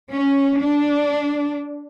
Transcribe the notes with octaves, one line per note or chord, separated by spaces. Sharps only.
C#4
D4